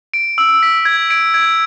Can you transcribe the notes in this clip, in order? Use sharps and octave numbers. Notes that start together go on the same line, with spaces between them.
D7
E6
B6
G#6
D7
G#6